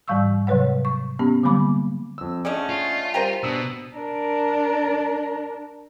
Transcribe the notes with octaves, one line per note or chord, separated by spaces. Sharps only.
G#2 E3 G3 F5 C#6 E6
C3 F#3 B4 C#5 F#5
C#6
B3 C#4 G4
D3 F#3 G3 A#3 B5 D6
F2 E6
D3 A3 C#4 G#4 D5 D#5
F4
G3 G4 A#4 C5 G#5 B6
B2 D4 D#6 E6
D4 A#4